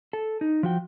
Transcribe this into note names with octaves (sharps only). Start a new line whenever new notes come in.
A4
D#4
F3 F#4 G5